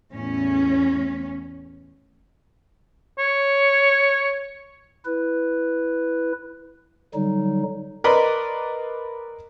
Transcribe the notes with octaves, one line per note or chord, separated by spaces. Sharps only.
E2 A2 C#4
C#5
E4 B4
D3 F#3 G3 D#4
A#4 B4 D5 D#5 B5 C6